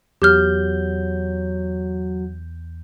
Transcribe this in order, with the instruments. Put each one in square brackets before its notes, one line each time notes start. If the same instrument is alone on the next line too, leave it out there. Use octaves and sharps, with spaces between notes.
[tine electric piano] E2 G6 [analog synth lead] F#3 [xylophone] G4 F6